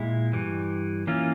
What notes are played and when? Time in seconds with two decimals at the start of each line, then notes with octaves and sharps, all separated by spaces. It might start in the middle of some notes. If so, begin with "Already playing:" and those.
Already playing: A#2 G#3 E4
0.33 G2 E3 G3
1.07 E3 A#3 C#4 F4